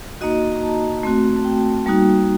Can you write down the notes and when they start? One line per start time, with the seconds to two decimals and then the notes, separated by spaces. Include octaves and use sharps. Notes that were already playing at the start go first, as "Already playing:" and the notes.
0.21 A#3 D#4 F#4 D#5
0.31 D#5
0.52 A#5
0.62 A5
1.03 A3 C4 F#4
1.36 A5
1.45 G5
1.86 G3 A#3 D#4 F#4